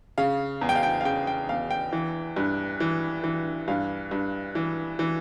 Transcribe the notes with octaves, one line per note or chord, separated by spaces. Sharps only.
C#3 F5
E2
G5
F5
G5
F5
C#3 G5
G5
E2 F5
G5
E3
G2
E3
E3
G2 F5
G2
E3
E3